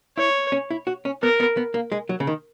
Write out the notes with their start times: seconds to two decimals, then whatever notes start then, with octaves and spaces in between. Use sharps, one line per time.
0.17 E4 C#5
0.52 C#4
0.71 E4
0.87 F#4
1.05 C#4
1.22 B3 A#4
1.40 B3
1.57 B3
1.74 A#3
1.92 G#3
2.09 F#3
2.20 C#3
2.27 D#3